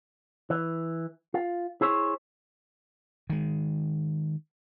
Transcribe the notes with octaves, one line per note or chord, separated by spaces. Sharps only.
E3
F4
E4 G#4 C5 C#5
D#3 G#3